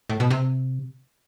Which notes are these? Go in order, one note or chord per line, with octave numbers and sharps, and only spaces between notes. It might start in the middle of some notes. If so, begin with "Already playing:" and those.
A2
B2
C3